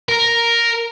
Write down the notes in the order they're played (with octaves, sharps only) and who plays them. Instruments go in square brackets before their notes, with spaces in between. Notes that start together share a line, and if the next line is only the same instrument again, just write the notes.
[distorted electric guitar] A#4